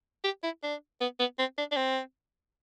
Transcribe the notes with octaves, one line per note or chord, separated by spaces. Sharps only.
G4
E4
D4
B3
B3
C4
D4
D4
C4